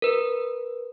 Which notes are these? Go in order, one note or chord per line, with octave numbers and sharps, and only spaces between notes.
A#4 B4